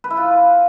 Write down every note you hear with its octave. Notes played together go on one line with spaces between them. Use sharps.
B4
E4
F4